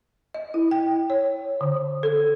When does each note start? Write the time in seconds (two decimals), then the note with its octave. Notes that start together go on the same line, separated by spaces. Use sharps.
0.34 D#5
0.54 E4
0.71 G5
1.10 C#5
1.61 D3
2.03 A4